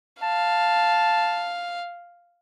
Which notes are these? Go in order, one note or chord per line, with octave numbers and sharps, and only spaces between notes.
F5 A5